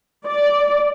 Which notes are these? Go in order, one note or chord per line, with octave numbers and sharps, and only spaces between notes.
D5